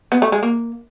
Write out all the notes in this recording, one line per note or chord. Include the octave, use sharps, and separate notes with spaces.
B3
A3
G#3
A#3